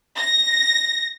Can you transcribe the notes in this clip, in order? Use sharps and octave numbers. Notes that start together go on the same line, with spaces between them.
A#6